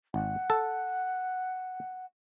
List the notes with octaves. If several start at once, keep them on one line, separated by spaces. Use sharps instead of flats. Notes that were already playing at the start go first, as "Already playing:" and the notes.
G#1 F#5
A4